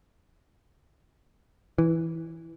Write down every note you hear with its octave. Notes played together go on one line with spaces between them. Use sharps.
E3